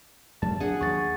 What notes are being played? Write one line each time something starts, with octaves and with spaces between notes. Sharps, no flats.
F#2 F#3 G3 A5
D4 G#4 F#5
D#2 F#3 C#6 A6